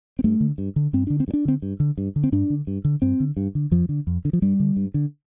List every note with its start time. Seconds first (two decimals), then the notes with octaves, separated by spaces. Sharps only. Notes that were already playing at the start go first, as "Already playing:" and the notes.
0.19 C4
0.24 G2 A3
0.40 D3
0.58 G2
0.76 D3
0.93 G2 C4
1.07 D3 D4
1.20 C4
1.28 G2
1.33 D4
1.45 D3 C4
1.62 G2
1.80 D3
1.98 G2
2.16 D3
2.24 C4
2.32 G2 D4
2.50 D3
2.67 G2
2.85 D3
3.02 G2 C4
3.20 D3
3.37 G2
3.55 D3
3.71 F2 F3
3.89 D3
4.07 F2
4.25 D3
4.33 F3
4.42 G2 G3
4.60 D3
4.77 G2
4.94 D3